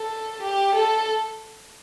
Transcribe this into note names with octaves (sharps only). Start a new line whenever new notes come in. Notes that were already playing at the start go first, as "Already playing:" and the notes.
Already playing: A4
G4
A4